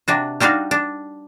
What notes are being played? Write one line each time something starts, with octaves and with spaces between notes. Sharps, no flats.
C3 D4 F#4
G3 D4 D#4 F#4 F5
D4